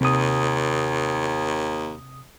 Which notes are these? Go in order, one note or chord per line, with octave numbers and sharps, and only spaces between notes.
D#2 C3 D#6